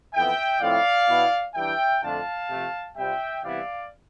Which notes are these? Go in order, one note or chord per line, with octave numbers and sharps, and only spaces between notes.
F2 E3 B3 E5 G5
A2 F3 C4 E4 D5 F5
B2 B3 E4
E3 G3 D4 E5 G5
F2 D3 A3 D4 F4 F5 A5
C3 F3 A3
C3 G3 C4 F4 E5 G5
C3 E3 G3 B3 E4 D5 F5